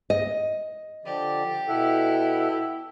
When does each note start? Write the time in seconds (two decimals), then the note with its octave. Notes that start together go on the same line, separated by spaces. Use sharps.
0.10 D#5
1.05 D3 F3 G4 D5
1.68 B2 E4 A4 F#5